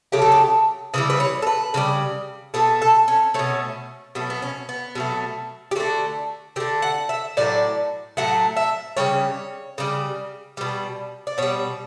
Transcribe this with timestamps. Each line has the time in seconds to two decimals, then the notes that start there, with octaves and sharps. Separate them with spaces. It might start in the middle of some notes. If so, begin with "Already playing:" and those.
0.12 C#3 F#3 A3 G4
0.22 A4
0.32 G4
0.94 C#3 E3 G3 B4
1.10 B4
1.20 C#5
1.42 A4
1.47 B4
1.74 C#3 E3 G3
2.54 B2 A3 A4
2.82 A4
3.08 C#4
3.34 B2 A3 C#4
4.15 B2 F#3 A3
4.30 B3
4.42 C#4
4.69 B3
4.95 B2 F#3 A3
5.71 G4
5.76 D3 A3 F#4
6.56 D3 G4
6.60 A3
6.82 F#5
7.09 E5
7.37 A2 F#3 A3 D5
8.17 A2 F#3 A3 F#5
8.56 E5
8.97 C#3 G3 C#5
9.78 C#3 G3
10.57 B2 G3
11.27 D5
11.38 B2 G3 C#5